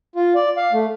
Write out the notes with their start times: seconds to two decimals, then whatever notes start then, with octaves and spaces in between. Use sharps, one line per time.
0.16 F4
0.35 D5
0.57 F5
0.72 A3